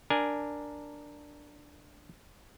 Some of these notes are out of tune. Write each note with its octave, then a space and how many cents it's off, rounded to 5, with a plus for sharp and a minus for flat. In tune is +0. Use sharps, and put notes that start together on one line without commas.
D4 +0 A#4 +0 G#5 +0